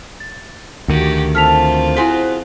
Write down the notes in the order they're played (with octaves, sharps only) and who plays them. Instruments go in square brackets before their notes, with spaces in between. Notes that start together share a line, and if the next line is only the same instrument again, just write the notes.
[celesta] A6
[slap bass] D2 D#3 [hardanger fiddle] F#4 G4
[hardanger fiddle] C4 F4 [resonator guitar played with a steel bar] A4 [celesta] F6 B6 F7
[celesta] E4 G#5 B6 [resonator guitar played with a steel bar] F#4 G#4 C5